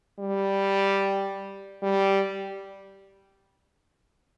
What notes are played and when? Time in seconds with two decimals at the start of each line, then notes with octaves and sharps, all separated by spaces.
0.19 G3
1.83 G3